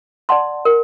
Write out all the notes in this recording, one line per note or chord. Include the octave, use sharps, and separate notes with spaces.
D5 F#5 A5 C6
A#4